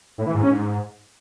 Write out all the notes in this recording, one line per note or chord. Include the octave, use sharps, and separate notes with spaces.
A2
E3
G#2
C#4
G#2